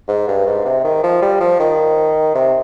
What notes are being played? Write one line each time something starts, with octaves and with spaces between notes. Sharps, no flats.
G#2
G2
G#2
C3
D#3
F3
G3
F3
D#3
C3